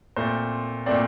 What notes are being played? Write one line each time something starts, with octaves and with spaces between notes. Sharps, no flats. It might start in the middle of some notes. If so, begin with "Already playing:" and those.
A#2 A3 C4 C5
A#2 A3 C4 D5